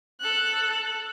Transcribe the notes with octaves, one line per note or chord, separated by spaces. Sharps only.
A4 F#6